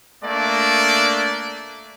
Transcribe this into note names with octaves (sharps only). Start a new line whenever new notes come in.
A3 A#3 D4 D5